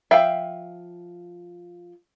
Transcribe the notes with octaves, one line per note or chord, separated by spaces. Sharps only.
F3 E5 F5 G5